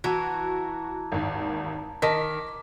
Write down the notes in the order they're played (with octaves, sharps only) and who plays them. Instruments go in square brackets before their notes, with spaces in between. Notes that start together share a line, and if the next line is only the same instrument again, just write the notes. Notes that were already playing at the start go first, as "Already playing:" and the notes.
[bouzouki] E3 [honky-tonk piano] F#4 [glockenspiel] A5 A#5 G#6
[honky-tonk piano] G#1 D#2
[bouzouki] D#3 [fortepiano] A#4 D#5 A5 [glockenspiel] D6 [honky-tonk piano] B6